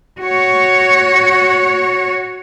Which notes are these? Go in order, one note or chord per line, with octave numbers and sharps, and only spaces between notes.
F#4 C#5